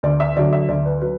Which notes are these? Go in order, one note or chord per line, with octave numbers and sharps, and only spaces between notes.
D2 D5
E5
D3 F#3 D5
E5
D2 D5
B4
F#3 B4